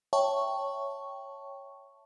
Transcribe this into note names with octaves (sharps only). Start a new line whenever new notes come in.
C#5 E5 G5 A5 C#6